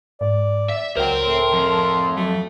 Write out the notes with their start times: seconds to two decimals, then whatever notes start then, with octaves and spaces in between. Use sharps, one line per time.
0.21 G#2 D5
0.69 E5
0.97 C#2 F#3 A#4 C5 G5
1.22 A2 C6
1.54 F2
2.17 F#3 A3